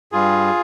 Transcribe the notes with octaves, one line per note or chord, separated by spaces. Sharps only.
G2 G3 F4 G#4